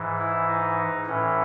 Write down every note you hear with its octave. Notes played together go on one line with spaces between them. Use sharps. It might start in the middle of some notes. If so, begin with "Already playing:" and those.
Already playing: G#2 E3
E4
D#4
A2 E3 C#4